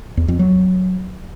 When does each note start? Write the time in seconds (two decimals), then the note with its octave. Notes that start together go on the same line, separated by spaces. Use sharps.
0.17 E2
0.28 F2
0.39 F#3